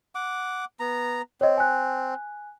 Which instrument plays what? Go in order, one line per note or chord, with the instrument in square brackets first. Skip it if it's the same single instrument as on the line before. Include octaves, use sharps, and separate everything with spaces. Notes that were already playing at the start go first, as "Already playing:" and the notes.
[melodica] F#5 D6
B3 A#5
[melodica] C4 [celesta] C#5 D#5
[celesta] G#5 F#6